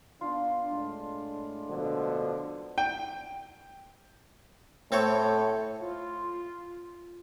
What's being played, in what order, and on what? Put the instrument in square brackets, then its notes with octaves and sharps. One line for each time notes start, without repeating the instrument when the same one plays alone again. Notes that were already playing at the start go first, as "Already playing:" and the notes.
[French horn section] B3 D4 [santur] F4
[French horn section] A2 G#3 D4
[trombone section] B2 D3 F3
[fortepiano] G5
[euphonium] A2 [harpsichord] C4 A4 C#5
[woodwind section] F4